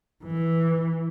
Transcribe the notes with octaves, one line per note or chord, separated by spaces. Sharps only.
E3